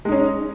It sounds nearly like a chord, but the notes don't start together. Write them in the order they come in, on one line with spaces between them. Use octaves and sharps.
G#3 D#4 C#4